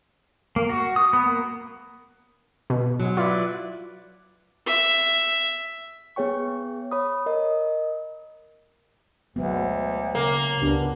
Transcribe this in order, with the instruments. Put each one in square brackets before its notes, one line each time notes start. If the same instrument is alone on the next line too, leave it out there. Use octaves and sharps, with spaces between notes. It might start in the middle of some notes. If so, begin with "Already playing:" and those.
[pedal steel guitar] A#3
F#4
D#6
B3
A#3
[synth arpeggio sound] B2
[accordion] G#2 G#3 [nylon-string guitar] F#3
[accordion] E4 B4 D5 [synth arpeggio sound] F4
[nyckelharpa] E5
[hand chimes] B3 G#4 C#5 G5 C#6
C#5 B5 D#6
A#4 D#5
[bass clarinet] D2 [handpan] F#3 G#3 B3
[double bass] C#3 [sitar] A#3
[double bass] C#2 [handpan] B3 D4 G4